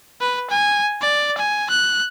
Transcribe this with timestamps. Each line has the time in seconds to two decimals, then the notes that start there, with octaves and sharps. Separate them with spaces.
0.21 B4
0.50 G#5
1.02 D5
1.38 G#5
1.70 F#6